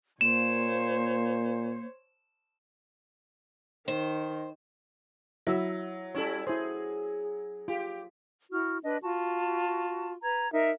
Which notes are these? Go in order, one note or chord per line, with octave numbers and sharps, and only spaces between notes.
A#2 A#3 C5 C#5 E7
D#3 C5
F#3 E4 E5
G3 C#4 E4 A4 C#5
E4 G#4 C5
F4 G4
E4 F#4 F6
D4 B4 D#5
F4 F#4 A5
B4 A#5 G#6
D#4 A#4 E5